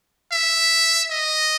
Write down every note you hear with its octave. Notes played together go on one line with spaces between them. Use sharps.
E5
D#5